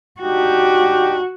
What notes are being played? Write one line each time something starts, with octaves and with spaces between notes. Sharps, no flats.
D4 D#4 F#4 G4